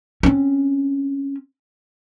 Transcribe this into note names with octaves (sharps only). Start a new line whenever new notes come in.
C4 C#4